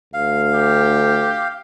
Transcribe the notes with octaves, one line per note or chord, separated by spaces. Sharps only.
D2 F5
G4